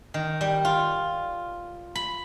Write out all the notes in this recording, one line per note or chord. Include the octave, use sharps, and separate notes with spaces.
D#3
G3
F4
B5